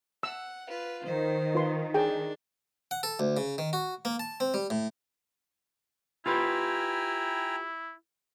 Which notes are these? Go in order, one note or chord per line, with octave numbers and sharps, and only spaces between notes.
F#5 E6
F4 B4
D#3 C5
F4 B4 C6
D4 G#4 G5
F#5
A4
D2
C#3
D#3
F#4
A#3
A5
C4
G3
A2
E4 F4 G4 B4 G5 G#5 A#5